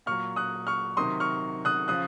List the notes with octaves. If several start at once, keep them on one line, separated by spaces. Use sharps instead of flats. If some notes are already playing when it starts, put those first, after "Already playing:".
A#2 F#3 C#6 F6
D#6 F#6
C#6 F6
C3 D#3 F#3 C6 D#6
C#6 F6
D#6 F#6
C#3 F3 D#6 F#6